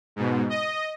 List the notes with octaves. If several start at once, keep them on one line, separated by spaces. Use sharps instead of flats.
G#2 B2
D#5